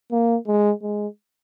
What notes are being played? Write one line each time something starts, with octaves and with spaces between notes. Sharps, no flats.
A#3
G#3
G#3